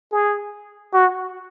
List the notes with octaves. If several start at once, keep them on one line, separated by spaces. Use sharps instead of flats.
G#4
F#4